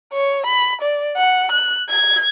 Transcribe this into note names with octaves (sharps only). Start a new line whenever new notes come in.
C#5
B5
D5
F#5
F#6
G#6